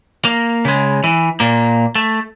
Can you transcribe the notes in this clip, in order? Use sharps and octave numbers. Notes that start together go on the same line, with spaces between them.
A#3
C#3 G#3
E3
A#2 A#3
A3